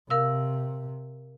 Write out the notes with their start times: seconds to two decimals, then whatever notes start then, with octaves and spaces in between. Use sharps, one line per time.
0.10 C3 A#4 F5 E6